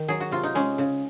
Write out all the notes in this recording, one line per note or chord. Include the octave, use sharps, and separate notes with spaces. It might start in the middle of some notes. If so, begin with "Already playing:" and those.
Already playing: D#3
F#3 G#4
F#4
C3 F4
D#4
G#3 C#4
C#3